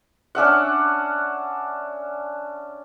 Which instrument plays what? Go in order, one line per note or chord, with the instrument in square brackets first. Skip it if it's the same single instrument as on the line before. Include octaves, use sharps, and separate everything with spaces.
[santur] C#4 D4 E5 F#5